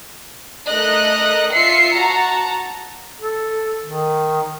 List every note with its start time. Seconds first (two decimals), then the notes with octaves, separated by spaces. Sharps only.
0.70 A3 A#4 D#5 F#6
1.53 F4 E5 C7 C#7
1.97 F#4 A5 A#5
3.20 A4
3.86 D#3